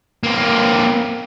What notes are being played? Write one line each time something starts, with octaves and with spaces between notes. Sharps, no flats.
A#3 C4